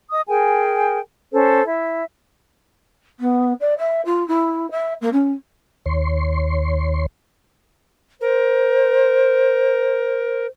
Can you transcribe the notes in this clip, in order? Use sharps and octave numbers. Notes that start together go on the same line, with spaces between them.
D#5 D#6
G#4 A#4 G5 G#5
C#4 A4 C5
E4 E5
B3
D5
E5
F4
E4
E5
A#3
C#4
D#2 C#5 C6
A#4 C5